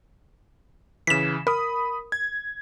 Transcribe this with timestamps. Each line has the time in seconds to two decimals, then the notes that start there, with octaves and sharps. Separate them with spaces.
1.07 C#3 E3 B6 E7
1.47 A#4 B5 D#6
2.12 G#6